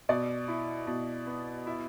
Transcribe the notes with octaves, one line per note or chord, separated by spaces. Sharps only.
B2 D5
E4
B2
B3
E4 E5